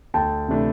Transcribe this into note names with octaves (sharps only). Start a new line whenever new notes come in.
D2 G5 A5
C3 E3 A3 D4